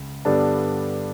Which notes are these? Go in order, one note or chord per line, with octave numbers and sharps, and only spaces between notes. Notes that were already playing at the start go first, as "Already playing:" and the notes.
Already playing: C#2 C#3
G2 D3 G3 B3 D4 A4 A5